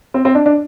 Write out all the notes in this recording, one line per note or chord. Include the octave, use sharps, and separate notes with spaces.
C4
C4
D4
D4